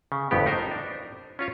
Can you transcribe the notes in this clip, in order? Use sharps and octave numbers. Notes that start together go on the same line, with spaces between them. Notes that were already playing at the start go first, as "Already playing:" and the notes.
C#3
G1 F2 A2 B3 G4
D#4 A#4 C5
D4
C#4 F4 C#5